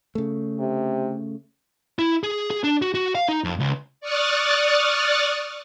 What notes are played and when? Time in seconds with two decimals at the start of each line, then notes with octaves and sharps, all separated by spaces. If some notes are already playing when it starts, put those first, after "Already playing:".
0.15 C#3 A3
0.59 C3
1.99 E4
2.23 G#4
2.50 G#4
2.64 D4
2.82 F#4
2.95 F#4
3.15 F5
3.28 D#4
3.44 F2
3.60 C#2
4.01 D5 C#6 D#6 F6 F#6 A6